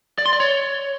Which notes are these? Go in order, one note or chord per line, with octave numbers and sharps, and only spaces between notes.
D5
C6
D5
C#5